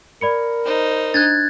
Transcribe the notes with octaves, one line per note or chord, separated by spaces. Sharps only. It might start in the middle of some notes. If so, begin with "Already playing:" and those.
A#4 D5 B5 C#7
D#4 C5
D4 F#6 G#6 A6